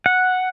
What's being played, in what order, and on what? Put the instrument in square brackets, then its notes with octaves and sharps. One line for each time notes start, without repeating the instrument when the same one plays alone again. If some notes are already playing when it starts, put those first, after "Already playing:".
[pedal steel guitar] F#5